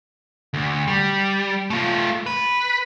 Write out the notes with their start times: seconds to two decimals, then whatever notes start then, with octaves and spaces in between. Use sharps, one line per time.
0.54 D2
0.88 G3
1.70 A3 F4
2.26 B4